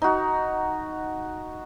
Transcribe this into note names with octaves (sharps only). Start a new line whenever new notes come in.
D#4 F#4